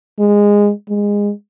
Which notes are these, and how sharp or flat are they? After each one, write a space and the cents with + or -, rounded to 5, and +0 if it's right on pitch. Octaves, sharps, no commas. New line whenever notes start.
G#3 -15
G#3 -20